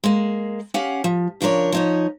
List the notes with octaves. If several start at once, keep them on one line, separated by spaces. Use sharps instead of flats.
G#3 A#3
C#4 G4 F5 F#5
F3
C#3 F3 D4 A#4 C#5
F3 D#4 C#5